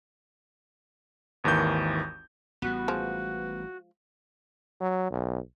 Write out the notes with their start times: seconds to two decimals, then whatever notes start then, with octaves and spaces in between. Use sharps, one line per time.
1.44 G#1 D#2 D#3 E3 G6
2.62 A1 A2 G3 B3 F#4
2.88 F3 G#3
4.81 F#3
5.11 B1